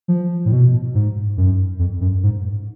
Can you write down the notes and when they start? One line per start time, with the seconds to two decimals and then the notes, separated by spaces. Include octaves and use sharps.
0.08 F3
0.45 A2
0.52 B2
0.95 G#2
1.37 F#2
1.79 F2
2.01 F#2
2.23 G#2